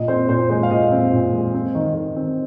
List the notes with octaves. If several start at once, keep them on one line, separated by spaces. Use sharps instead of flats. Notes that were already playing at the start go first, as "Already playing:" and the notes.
Already playing: A#2 D#5
C4 C5
A#2 C5
G#3 C5
F5
A#2 D#5
C4
A#2
G#3
C4
D#3
D#3
C4